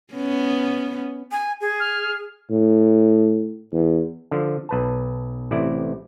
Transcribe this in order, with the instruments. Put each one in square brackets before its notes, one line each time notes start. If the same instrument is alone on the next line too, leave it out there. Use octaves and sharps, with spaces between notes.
[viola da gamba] B3 C#4
[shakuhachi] G#5
G#4
[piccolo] F6
[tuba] A2
E2
[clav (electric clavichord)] D3 F3
B1 B4 A5
A1 C3 E4 D5